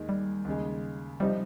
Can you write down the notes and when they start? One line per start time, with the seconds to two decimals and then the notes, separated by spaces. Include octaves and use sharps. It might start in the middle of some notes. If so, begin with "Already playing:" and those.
Already playing: D#2 D#3 G#3
0.09 G3
0.45 D#2 C#3 G#3
1.20 C3 F3 G3 C4 D#4 G4